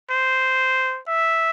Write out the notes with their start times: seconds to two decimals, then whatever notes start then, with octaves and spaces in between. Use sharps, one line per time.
0.10 C5
1.08 E5